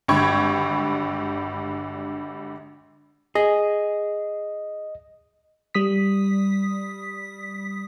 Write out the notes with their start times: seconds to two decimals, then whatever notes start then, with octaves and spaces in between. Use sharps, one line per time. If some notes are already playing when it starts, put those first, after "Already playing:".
0.08 G#1 G2 D3 G5 C#6 G#6
3.35 G#4 D#5
5.74 G3 D#6 B6